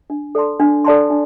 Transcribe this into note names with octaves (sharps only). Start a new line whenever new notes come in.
D4
A4 D5 A5 C6
D4
A4 D5 A5 C6
D4